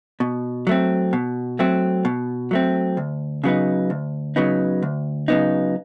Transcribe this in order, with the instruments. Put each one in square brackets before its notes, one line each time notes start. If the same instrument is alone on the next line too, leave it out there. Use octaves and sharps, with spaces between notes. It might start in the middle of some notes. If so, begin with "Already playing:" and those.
[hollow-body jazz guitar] B2
F#3 A3 C4
B2
F#3 A3 C4
B2
F#3 A3 C4
D2
C#3 F#3 B3 D#4
D2
C#3 F#3 B3 D#4
D2
C#3 F#3 B3 D#4